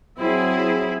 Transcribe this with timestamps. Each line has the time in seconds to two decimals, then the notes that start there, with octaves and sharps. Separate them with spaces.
0.19 F#3 C4 E4 G#4